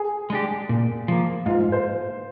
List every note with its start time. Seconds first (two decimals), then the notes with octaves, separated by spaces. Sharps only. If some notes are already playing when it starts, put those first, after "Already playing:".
Already playing: G#4
0.30 G#3 D4 G4
0.69 A#2
1.08 F3 A#3
1.46 G#2 F4
1.72 C5